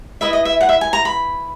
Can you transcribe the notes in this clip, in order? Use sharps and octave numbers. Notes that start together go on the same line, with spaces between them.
E4 B4 D#5 E5
D#5
E5
F#5
E5
G#5
A#5
B5